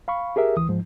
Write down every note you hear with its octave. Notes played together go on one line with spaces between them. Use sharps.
F5 B5 C#6
G4 G#4 A#4 E5
D2 E3 D#6
G#2 F3